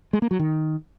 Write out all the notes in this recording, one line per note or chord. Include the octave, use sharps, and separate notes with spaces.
G#3
A#3
F#3
D#3